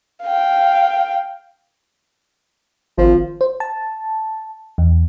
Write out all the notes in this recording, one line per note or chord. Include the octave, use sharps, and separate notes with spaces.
F5 G5
G#1 F3
C5
A5
E2